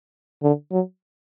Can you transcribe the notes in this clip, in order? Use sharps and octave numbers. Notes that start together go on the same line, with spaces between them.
D3
F#3